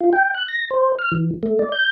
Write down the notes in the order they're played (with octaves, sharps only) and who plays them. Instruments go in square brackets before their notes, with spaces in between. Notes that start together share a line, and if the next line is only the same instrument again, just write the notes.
[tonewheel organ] F4
G5
F#6
A#6
C5
F6
E3
A3
D5
G6